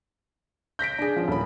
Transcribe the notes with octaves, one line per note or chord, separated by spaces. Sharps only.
G6 A#6 B6 D7
D4 G#4
F3 C#4
D#1 B5